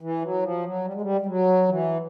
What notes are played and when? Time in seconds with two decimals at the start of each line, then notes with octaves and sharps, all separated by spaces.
0.01 E3
0.22 F#3
0.43 F3
0.64 F#3
0.85 G3
0.94 G#3
1.01 G3
1.21 G3
1.26 F#3
1.68 E3